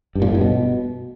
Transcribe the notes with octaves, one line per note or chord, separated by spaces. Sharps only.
G2
A#2
A2
G2
B2